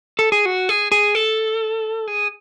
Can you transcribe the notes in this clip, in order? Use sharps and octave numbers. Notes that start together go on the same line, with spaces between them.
A4
G#4
F#4
G#4
G#4
A4
G#4